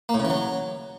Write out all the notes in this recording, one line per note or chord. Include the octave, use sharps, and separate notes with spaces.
A#3
A2
C#3
E3
F#3